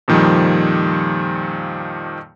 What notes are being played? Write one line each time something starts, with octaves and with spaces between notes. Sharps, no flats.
F2 A#2 D#3 F3 G3